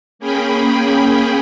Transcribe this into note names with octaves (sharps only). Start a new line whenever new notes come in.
A#3 C#4 G#4 G5 B5